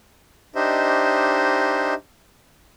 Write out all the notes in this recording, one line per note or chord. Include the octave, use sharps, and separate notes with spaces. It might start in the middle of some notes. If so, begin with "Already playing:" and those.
D4 D#4 G4 C5 D#5 E5